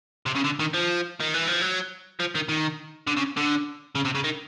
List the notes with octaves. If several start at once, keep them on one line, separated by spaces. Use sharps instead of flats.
C3
C#3
D3
D#3
F3
D#3
E3
F3
F#3
F3
D#3
D#3
D3
C#3
D3
C#3
C3
C#3
D#3